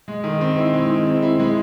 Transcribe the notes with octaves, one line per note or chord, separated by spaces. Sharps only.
G#3
D#3
C4
E4
G#3
D#3
C4
E4
G#3